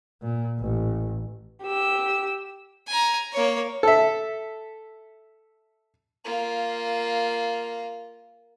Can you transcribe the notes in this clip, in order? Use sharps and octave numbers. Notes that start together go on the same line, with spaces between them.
A#2
A1
G4 E6
G#5 A#5
A#3 C#5
A4 E5
A#3 F4